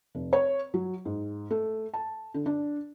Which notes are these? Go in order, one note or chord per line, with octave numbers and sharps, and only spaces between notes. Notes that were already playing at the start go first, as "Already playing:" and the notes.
F1
C#5
F#3
G#2
A3
A5
D3
D4